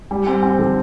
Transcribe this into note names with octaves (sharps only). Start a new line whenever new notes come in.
G3
C4
C4
D3